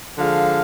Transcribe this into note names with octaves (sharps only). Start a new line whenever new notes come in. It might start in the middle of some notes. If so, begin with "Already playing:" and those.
D3 F3 G#3 F5